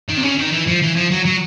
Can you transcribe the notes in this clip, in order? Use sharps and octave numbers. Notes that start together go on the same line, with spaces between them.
D#3
C3
C#3
D#3
E3
F3
E3
F3
F#3
F#3